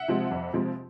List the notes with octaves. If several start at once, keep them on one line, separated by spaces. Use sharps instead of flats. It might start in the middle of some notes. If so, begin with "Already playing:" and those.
Already playing: E5 F#5
C3 F3 G#3 C4
F2
C3 F3 G#3 C4